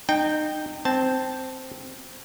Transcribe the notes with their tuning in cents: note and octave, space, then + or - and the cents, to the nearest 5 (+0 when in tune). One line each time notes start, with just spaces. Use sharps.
D#4 -25 G5 +0
C4 -5 A5 -5